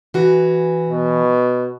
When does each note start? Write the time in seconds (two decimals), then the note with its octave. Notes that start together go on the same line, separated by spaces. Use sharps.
0.14 E3 F#4 B4
0.89 B2